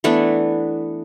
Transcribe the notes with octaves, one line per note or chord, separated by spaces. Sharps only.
E3 A3 B3 D4